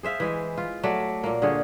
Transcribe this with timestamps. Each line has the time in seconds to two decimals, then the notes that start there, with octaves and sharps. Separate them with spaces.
0.03 G#4 C5 E5 F5
0.20 E3 G#3
0.58 F4
0.83 F#3 A3 D5
1.24 A#2 A#3
1.42 D3 F4 G#4 C#5